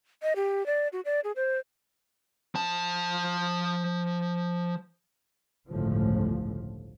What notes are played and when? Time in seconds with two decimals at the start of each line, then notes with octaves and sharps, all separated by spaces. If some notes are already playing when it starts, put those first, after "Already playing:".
0.23 D#5
0.36 G4
0.66 D5
0.93 F#4
1.05 D5
1.24 G#4
1.36 C5
2.55 F3 A5
5.70 G1 C#2 A2 D3 F3